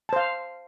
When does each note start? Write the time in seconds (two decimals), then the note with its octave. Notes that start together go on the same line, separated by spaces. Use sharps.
0.09 A5
0.13 C5
0.16 F5